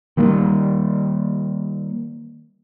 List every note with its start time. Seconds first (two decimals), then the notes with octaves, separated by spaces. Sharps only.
0.17 D#3 G3 A#3